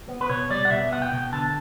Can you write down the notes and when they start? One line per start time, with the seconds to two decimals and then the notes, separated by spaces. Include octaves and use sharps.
0.08 B3
0.21 B4
0.29 B2 C#5
0.50 G3 D5
0.65 F#5
0.70 B2 E5
0.91 B3 F#5
1.02 G5
1.12 B2
1.32 D3 A5